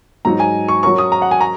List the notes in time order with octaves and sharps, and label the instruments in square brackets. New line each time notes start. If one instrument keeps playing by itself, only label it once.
[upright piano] G#2 F#3 D#4 [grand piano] A#5
[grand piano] G#5
C#6
[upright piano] F#3 C#4 F#4 A#4 [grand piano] C#6
[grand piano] D#6
A#5
F#5
G#5
A#5